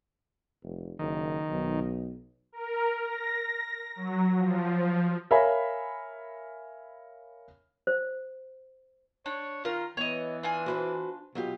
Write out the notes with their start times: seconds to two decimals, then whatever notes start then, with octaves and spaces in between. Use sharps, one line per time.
0.64 F1
0.99 F#1 D#3
1.49 B1
2.52 A#4
3.01 A#6
3.96 F#3
4.36 F3
5.31 A#4 C#5 E5 F5 G#5 B5
7.87 C5
9.26 D4 C#5
9.65 D#3 F4 A#4
9.97 E3 B3 C#5 D#5
10.43 D4 F4 G#5
10.66 F#4 B4 C5
11.35 B2 F#3 F4 G4